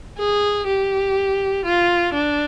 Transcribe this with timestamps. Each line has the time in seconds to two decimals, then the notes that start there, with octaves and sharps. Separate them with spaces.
0.18 G#4
0.67 G4
1.65 F4
2.14 D4